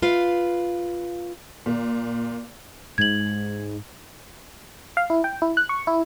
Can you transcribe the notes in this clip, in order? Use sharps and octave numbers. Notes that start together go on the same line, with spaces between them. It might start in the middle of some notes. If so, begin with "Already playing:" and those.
F4 B4 F5
A#2
G#2 G#6 F#7
F5
E4
G5
E4
F#6
C#6
E4